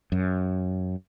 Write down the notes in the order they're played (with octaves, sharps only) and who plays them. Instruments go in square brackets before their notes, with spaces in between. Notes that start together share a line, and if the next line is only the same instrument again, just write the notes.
[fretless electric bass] F#2